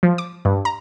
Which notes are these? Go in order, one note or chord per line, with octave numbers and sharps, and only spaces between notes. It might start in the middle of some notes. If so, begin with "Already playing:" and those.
F3
D6
G2
A#5